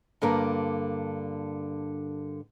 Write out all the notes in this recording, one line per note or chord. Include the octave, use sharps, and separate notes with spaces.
G2 D3 A#3 A#4